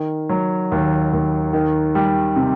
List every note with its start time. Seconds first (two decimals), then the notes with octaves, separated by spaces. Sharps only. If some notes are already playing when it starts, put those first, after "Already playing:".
Already playing: D#3
0.29 F#3
0.72 D#2
1.13 D#2
1.53 D#3
1.95 G3
2.36 C3